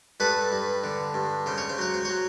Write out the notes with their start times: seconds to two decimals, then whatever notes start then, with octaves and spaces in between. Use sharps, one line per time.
0.20 G2 A4 B4
0.52 G2
0.84 D3
1.14 G2
1.46 C#3 C5
1.58 C#5
1.69 C5
1.78 F#3 C#5
1.94 C5
2.05 F#3 C#5